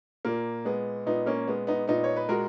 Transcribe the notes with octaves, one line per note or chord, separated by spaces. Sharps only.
A#2 A#3
G#3 B3
A#2 B3 D#4
A#3 C#4
G#3 B3
B3 D#4
A#2 B3 D#4
C#5
B4
G#3 F#4 A#4